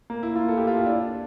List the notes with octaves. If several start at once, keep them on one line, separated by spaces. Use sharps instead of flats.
A#3
E4
F4
A4
G4
F4
E4
D4